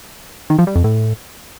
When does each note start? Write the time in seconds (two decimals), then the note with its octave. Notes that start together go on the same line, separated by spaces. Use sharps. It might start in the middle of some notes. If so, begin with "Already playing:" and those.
0.50 D#3
0.58 F3
0.67 G3
0.76 F2
0.84 A2